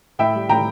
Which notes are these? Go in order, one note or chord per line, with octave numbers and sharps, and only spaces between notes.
A2 E5 G5
G3
A2 G5 A#5